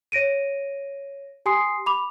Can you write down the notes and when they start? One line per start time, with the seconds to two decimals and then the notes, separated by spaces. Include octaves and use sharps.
0.12 C#5 A#6 D7 D#7
1.46 G4 G#5 C6 D#6 C7
1.86 B5 D6 F7